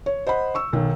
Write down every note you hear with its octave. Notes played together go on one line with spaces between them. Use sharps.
C#5
C5 D#5 F#5 B5
C#6 E6
B1 D#3